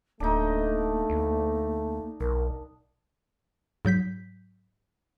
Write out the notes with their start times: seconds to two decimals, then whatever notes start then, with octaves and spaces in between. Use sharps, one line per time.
0.20 D1 A3 A#3 D4 D#4
1.10 D2
2.20 B1 A#4
3.85 G#2 F#3 G6 B6